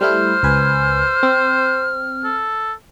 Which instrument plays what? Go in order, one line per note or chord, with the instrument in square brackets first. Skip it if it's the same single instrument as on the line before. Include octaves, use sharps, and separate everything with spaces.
[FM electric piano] G3 A3 E4 [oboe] C5 [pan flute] F6
[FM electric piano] C#2 B4 G#5
C4
[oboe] A4